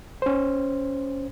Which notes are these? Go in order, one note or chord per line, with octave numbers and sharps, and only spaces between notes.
C#4 C5